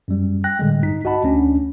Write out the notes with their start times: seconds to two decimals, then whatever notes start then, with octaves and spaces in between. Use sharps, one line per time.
0.08 F#2 G3
0.44 G5 F#6 A#6
0.59 A2 D3 G3 G#3
0.82 B1 G2 D#4 B6
1.05 F#4 D#5 F#5 A5 B5
1.24 D2 C#4 D4